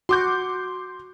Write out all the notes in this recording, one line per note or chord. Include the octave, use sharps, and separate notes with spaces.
F#4 C6 D6 G6